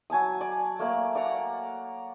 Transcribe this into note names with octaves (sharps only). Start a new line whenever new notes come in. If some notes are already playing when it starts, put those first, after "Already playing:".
F#3 G#5 A5 D#6
D5
A3 A#3 D5
D5 F#5 A#5